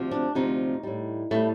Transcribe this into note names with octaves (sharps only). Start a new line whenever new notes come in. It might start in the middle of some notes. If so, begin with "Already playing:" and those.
Already playing: D2 C3 F3
D4
D2 C3 F3 D#4
A2 G3
A2 G3 A3